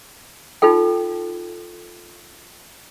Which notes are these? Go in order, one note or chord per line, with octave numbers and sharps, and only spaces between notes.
D#4 F4 A4 G5